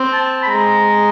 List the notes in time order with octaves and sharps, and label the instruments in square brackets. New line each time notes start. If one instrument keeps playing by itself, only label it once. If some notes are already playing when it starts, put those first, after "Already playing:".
Already playing: [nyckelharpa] C4
[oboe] A5
B5
[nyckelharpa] G#3 [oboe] A#5